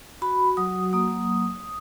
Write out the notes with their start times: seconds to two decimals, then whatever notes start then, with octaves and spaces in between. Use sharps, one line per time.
0.22 F#4 B5
0.57 F#3 D#6
0.93 A#3 D#6